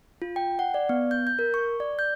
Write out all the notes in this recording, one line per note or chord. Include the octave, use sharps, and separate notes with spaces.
F4
G5
F#5
D5
B3
G6
G6
A#4
C#6
D5
G6